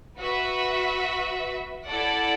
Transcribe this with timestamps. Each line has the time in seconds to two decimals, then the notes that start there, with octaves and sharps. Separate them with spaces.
0.19 F#4 B4 E5
1.88 E4 A4 D5 F#5